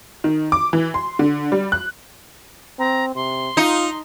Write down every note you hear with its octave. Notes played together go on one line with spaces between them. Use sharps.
D#3
D6
E3
C6
D3
G3
F#6
C4 A#5
C3 C6
D#4 F4